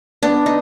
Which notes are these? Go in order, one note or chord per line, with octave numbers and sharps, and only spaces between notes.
B3 D4
D#4